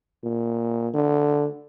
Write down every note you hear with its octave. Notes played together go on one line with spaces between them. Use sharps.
A#2
D3